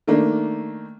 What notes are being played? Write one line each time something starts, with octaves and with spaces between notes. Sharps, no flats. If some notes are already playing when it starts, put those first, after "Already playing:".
D#3 A3 A#3 D4